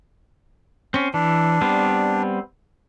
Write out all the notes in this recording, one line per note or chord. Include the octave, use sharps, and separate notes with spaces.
C4 C#4
E3 D4
G3 B3 C4